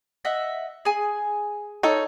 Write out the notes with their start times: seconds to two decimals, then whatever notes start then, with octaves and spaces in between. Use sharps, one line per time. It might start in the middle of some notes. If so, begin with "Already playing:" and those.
0.25 D#5 E5 F#5
0.85 G#4 G#5
1.83 D#4 A4 C#5